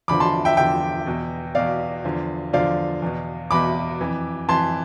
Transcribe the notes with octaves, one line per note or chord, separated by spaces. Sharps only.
E2 D3 F3 B5 D6
A5 C6
E5 G5
E2 D3 F3 E5 G5
E2 B2
E2 B2 D5 F5
E2 D3 F3
E2 D3 F3 D5 F5
E2 B2
E2 B2 B5 D6
F2 E3
F2 E3 A5 C6